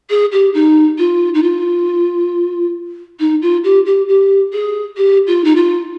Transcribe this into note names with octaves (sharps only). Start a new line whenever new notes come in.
G#4
G4
D#4
F4
D#4
F4
D#4
F4
G4
G4
G4
G#4
G4
F4
D#4
F4